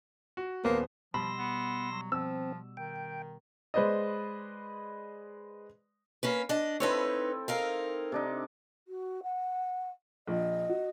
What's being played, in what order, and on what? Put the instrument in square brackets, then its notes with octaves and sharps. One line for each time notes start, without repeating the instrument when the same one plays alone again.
[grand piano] F#4
[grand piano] D#1 B3 C5 [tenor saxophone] A#3
[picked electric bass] B2 G3 [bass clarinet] F3 [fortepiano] B5 [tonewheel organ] C6 E6 A#6
[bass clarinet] B3
F#3
[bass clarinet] F3 [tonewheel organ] C4 [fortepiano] E6
[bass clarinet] D#3 [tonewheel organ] G5
[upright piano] G#3 B4 C5 D5 D#5
[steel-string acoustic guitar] A#3 C#4 B4
D4 D#5
[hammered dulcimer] C4 E4 A4 [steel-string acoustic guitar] D#4 B4 C#5
[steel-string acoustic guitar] D#4 A#4 F5
[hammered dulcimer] C3 D4 D#4
[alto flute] F#4
F#5
[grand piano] A#1 [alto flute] D#5
[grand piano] F#4